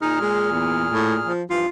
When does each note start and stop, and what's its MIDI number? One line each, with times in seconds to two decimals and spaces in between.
0.01 1.32 46
0.01 0.19 63
0.01 1.32 68
0.01 1.32 89
0.21 0.50 56
0.51 0.86 40
0.92 1.17 45
1.27 1.43 53
1.50 1.66 43
1.50 1.66 52
1.50 1.66 53
1.50 1.68 65